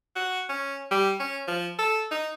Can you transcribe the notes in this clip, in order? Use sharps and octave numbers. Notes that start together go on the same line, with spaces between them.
F#4
C#4
G3
C#4
F3
A4
D#4